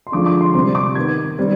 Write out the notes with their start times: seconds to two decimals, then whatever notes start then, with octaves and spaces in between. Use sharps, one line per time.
0.07 C6
0.12 D3 F3 G#3 D6
0.26 D6
0.41 C6
0.54 C3 G3 C4 C6
0.75 D6
0.95 D#3 B3 G#6
1.38 D#3 G3 C4